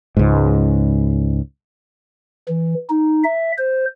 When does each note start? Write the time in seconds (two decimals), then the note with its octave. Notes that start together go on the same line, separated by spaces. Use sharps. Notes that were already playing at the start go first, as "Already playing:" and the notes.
0.17 C#2 G#2
2.48 E3
2.90 D#4
3.24 E5
3.58 C5